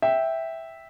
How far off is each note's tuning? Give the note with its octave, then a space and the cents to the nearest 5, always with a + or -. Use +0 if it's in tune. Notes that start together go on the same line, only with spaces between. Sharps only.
E5 -5 G5 +0